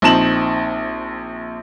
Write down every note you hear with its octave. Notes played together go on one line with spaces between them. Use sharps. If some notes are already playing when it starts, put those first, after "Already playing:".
A#1 C4 D#4 A5 E7 F#7